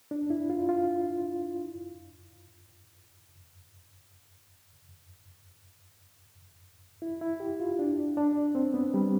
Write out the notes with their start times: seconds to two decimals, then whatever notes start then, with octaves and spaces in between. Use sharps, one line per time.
0.11 D4
0.30 E4
0.50 F4
0.69 F4
7.02 E4
7.21 E4
7.40 G4
7.60 F4
7.79 D4
8.17 D4
8.55 C4
8.74 B3
8.94 G3